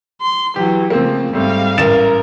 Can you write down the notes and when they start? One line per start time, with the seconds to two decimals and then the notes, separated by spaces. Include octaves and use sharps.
0.21 C6
0.56 E3 F#3 G4
0.90 C#3 F3 A3 A#3 C4
1.33 G#2 G3 A3 C4 F5
1.78 A1 A#4 A6 E7